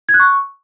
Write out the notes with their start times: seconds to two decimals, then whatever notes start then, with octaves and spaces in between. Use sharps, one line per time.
0.09 G#6
0.14 F#6
0.20 C#6